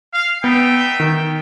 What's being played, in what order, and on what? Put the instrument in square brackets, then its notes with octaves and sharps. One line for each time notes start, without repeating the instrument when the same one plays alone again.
[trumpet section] F5
[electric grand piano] B3 [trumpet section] D#4 E5 G5
[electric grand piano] D#3